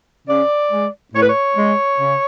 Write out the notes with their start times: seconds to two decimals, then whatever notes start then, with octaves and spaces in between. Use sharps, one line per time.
0.28 C#3 D5
0.71 G#3
1.14 A2 C#5
1.21 B4
1.29 C#5
1.57 G#3
2.00 C#3